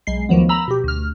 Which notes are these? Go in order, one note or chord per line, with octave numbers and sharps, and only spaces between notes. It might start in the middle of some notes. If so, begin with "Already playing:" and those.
B1 G#3 C7
D2 D#3 F3 F#3 B3
A#5 B5 E6
B2 G4
D2 F6